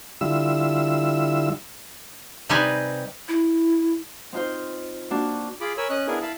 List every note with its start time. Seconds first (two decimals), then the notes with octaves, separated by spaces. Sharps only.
0.21 D3 G3 E4 F4 E6
2.49 C3 G3 C4 D#4 B4 G#5
3.28 E4
4.33 C4 D#4 F4 C5
5.10 A#3 D4 F#4
5.61 F4 G#4 B5 D6
5.77 A#4 C#5 G#5 B5 E6
5.90 C#4 D#5 F#6
6.07 B3 D4 E4 G#4 A#4 G#5
6.22 E4 F5 A5 B5